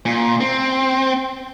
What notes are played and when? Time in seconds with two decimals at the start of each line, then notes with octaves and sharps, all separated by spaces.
0.06 A#2
0.41 C4